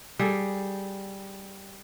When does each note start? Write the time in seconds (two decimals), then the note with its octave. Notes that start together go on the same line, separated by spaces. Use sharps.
0.19 G3 G#4 A4